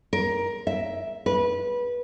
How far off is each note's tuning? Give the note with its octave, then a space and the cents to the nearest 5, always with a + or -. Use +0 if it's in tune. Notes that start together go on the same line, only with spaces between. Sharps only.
A#4 +15
E5 +0
B4 -20